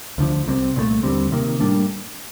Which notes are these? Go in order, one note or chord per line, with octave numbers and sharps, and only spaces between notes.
D2 D3 F3
C2 C3 G3 C4
C2 A#2 F3 A3
D#2 D3 G3 C4
C3 D#3 A#3
A2 G3 A#3 D4